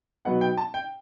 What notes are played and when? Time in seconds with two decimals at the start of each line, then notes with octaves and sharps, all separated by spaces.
0.25 B2 F#3 B3 D#4 F#5
0.41 G5
0.57 A5
0.74 G5